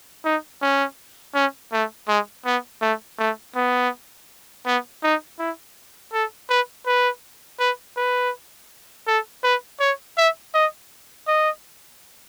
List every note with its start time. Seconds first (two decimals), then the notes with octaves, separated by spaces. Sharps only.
0.25 D#4
0.62 C#4
1.35 C#4
1.73 A3
2.08 G#3
2.46 B3
2.82 A3
3.19 A3
3.56 B3
4.66 B3
5.03 D#4
5.39 E4
6.13 A4
6.50 B4
6.87 B4
7.60 B4
7.97 B4
9.07 A4
9.44 B4
9.80 C#5
10.18 E5
10.54 D#5
11.28 D#5